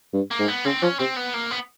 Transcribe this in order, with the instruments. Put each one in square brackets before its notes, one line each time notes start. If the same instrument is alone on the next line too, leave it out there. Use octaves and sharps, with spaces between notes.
[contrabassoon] G2
[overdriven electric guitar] A#3
[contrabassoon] G#2
[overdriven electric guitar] B3
[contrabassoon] C#3 [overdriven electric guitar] C4
[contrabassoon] F3 [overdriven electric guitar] C#4
[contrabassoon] C3 [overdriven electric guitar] C4
[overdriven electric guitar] B3
A#3
B3